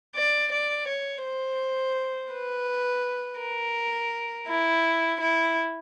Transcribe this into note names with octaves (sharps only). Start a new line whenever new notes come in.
D5
D5
C#5
C5
B4
A#4
E4
E4